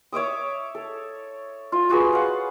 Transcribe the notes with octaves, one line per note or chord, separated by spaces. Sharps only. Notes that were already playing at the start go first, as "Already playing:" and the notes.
C#5 E5 D6 D#6
A4
F4
F4 F#4 G#4 B4
F5 F#5